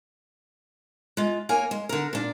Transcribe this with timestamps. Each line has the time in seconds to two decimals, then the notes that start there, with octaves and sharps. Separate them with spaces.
1.17 G#3 F4
1.49 A#3 A#4 C#5 G#5
1.71 G#3
1.89 D3 A#4
2.13 A#2 D4